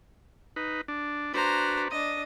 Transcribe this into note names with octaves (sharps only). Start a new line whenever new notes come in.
D#4 B4
D4
D4 F#4 B4 C5 A#5
D4 D#5 D#6